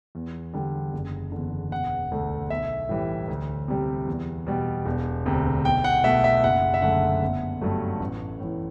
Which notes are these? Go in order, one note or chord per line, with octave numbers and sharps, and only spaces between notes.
E2
D3 G3
F#1
E2 D3
E1 F#5
D2 D3 A3
B1 E5
A2 E3 G3
D2
C3 G3
E2
B2 G3
E1
D2 C3
B1 G5
F#5
B2 A3 E5
E5
F#1 F#5
E5
F#2 D3 A3 F#5
G1
G2 F#3 A3
A1
A2 E3